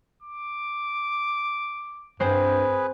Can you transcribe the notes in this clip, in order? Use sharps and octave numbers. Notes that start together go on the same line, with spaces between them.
D6
G2 C4 G#4 B4 C5